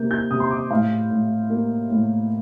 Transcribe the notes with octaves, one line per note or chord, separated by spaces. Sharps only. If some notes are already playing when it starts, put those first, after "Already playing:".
Already playing: C3 A#3 G6
G6
C3 D#6
C6
D6
A2 F5
A2
A#3
A2